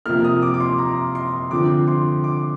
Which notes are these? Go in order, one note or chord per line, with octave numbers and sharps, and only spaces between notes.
C3 F3 A#3 F6
D#6
D6
D6
C6
A#5
C6
D3 F3 C4 D6
C6
D6